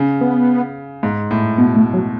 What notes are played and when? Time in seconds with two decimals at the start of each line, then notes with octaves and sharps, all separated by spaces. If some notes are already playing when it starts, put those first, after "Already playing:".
Already playing: C#3
0.21 B3
1.03 G#2
1.31 A2
1.58 B2 B3
1.77 A3
1.94 F#3